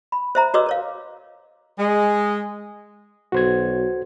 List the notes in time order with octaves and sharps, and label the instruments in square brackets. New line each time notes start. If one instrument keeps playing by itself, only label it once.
[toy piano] B5
C5 E5 A#5
F#4 B4 C#5 D#5 D6 E6
A#4 C#5 F5
[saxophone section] G#3
[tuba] B1 [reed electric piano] F#4 C5 G#6